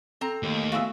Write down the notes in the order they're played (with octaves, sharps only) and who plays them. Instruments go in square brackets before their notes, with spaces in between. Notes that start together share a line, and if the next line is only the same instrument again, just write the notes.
[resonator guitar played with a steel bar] C4 A#5 [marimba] A4
[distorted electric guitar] D#2 [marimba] A3
[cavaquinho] F4 G#4 E5 [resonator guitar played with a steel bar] F#4